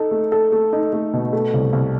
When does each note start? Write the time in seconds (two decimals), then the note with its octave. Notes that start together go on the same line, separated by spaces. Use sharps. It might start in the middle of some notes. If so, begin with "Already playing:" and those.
Already playing: D#4 A4
0.11 A3
0.32 A4
0.52 A3
0.73 D#4
0.93 A3
1.13 B2
1.33 A3
1.54 C2
1.73 C2